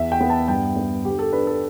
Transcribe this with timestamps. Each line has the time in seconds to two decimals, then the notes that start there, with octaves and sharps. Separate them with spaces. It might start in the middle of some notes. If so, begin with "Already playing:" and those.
Already playing: E2 E5
0.12 G5
0.20 B3
0.30 A5
0.48 G2 G5
0.76 B3
1.05 D3 G4
1.19 A4
1.32 D4 B4
1.47 A4